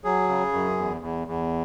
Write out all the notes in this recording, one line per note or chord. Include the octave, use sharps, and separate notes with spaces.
F#3 G#4
C#3
F#2
E2
E2
E2